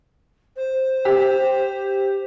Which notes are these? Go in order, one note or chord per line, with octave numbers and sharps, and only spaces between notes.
C5
G4